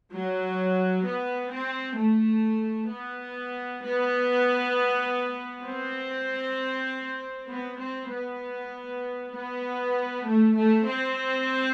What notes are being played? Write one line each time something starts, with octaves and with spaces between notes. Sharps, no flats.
F#3
B3
C4
A3
B3
B3
C4
B3
C4
B3
B3
A3
A3
C4